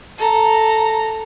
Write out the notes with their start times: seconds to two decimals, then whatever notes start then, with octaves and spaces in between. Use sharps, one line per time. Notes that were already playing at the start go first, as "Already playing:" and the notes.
0.18 A4 A#5